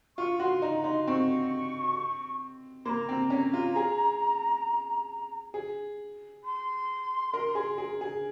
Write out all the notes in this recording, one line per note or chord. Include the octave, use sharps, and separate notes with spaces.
F4 C#6
F#4 C6
D#4 A#5
D#4 C6
C4 C#6
A#3 A#5 C6
C4
C#4
F4
G#4
G#4
C6
A#4
G#4
G#4
G#4